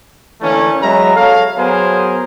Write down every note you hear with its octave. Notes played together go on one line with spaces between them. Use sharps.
D3 E3 A3 A#3 C#4
F#3 G#3 B3 E5 A#5
A4 C#5 F5
F#3 B3 G#4 A#4 C5